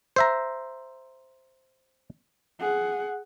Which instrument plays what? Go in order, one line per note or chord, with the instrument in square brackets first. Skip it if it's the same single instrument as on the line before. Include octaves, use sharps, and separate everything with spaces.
[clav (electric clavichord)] C5 E5 A#5
[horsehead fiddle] G#4 F#5